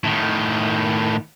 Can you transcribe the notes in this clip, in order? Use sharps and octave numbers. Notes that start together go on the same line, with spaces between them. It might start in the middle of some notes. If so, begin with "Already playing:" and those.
A2 D#3